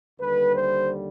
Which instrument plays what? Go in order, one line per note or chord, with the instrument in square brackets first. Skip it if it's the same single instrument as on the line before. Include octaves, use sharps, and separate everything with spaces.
[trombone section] D#2 D3 G3 B4
C5